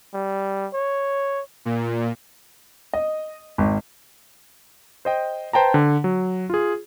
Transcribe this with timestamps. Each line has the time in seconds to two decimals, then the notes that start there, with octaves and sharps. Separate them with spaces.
0.14 G3
0.74 C#5
1.65 A#2
2.93 D#5
3.58 G#1
5.05 C5 D#5 G5
5.53 B4 C5 G5 A5 A#5
5.74 D3
6.04 F#3
6.50 F4 G#4